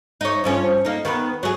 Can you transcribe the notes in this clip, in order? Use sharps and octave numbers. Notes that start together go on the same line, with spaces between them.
D#4 C#5
G2 F3 C#4
A#3 D#4
D#3 B3 B4
F#3 G#4